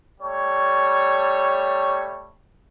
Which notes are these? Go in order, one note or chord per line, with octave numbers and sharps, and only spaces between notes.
G3 A3 C#5